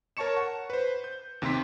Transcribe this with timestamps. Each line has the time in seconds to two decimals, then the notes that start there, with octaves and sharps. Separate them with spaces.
0.17 A#4 C#5 A5 C#6 C#7 E7
0.37 F#5
0.70 B4 C5
1.04 G6
1.42 D#2 C3 C4 G4 C6 B6